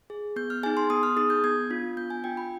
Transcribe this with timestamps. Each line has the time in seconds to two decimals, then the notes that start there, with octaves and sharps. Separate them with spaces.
0.10 G#4
0.36 B3 G6
0.50 F6
0.63 D#4 G#4 G#5
0.77 C6
0.90 B3 D#6
1.03 F6
1.17 D#4 G#4 D#6
1.30 G6
1.44 B3 G#6
1.70 D4 F4
1.97 B3 G6
2.10 G#5
2.24 D4 F4 G5
2.37 B5